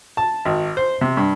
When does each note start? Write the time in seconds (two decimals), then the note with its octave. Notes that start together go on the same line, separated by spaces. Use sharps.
0.17 A5
0.45 G#1
0.77 C5
1.01 C3
1.17 G2